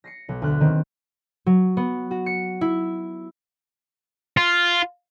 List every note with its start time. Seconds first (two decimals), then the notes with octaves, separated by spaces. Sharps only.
0.04 A#6 C7 C#7
0.29 B1
0.42 D2 F#6
0.60 D#3 C4
1.46 F#3
1.77 B3
2.11 F#4
2.26 C#7
2.61 E4
4.37 F4